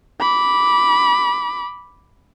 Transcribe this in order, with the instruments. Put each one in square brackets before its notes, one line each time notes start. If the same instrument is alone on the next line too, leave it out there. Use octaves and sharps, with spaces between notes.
[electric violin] B5 D6